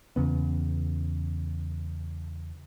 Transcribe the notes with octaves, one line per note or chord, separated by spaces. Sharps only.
E2 C#3 B3